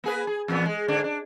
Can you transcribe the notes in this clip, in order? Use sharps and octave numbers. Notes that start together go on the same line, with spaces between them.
A#3 G#4 B4
G#4
E2 A#2 B3
G#3
G#2 D3 D4
D4